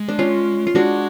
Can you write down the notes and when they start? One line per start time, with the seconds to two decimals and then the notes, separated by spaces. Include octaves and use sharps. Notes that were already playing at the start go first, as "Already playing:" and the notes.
Already playing: G#3
0.08 D4
0.19 C#4 F4
0.67 F4
0.75 G#3 D4 F#4